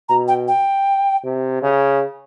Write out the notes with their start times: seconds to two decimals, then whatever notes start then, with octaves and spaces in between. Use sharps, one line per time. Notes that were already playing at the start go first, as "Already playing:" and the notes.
0.09 B2 A#5
0.28 G5
0.48 G5
1.24 C3
1.62 C#3